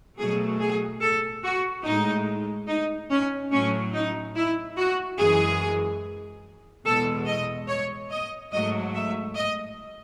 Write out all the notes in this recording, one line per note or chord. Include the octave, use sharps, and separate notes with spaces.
B2 F#3 A3 G#4
G#4
A4
F#4
A2 G#3 D#4
D#4
C#4
A2 F#3 A3 C#4
D#4
E4
F#4
F#2 E3 G#3 G#4
E2 B2 G#3 A4
D#5
C#5
D#5
G#2 F#3 A3 D#5
E5
D#5